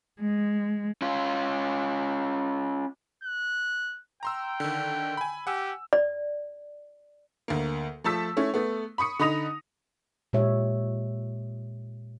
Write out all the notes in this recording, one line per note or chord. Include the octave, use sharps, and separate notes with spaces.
G#3
C#4 F4
F#6
G5 A#5 C6 E6
D3 D#3
G#5 B5
G4 F#5 G#5 E6
D5
D2 A#3
F3 A3 A4 A5 E6 B6
A3 C#4 E4
A3 B3
B5 C#6 D#6 C#7
D3 D#4 B5 D#6 A#6 F7
A#2 G#3 G4 C#5 E5